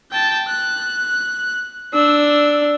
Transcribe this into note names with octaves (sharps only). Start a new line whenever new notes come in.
G5 A5
F#6
D4 E6